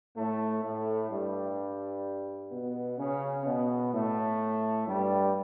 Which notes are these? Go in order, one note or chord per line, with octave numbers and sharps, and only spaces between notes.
A2 A3
A2 A3
G2 G3
B2 B3
C#3 C#4
B2 B3
A2 A3
G2 G3